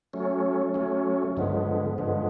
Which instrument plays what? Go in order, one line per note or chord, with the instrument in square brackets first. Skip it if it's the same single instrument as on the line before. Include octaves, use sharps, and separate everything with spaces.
[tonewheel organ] F#3 A3 C#4
F#3 A3 C#4
G2 D3 F3 G#3 B3
G2 D3 F3 G#3 B3